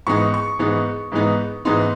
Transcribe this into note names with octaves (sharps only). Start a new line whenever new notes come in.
G#2 E3 G#3 B3 D#4 C#6
C#6
G#2 E3 G#3 B3 D#4
G#2 E3 G#3 B3 D#4
G#2 E3 G#3 B3 D#4 C6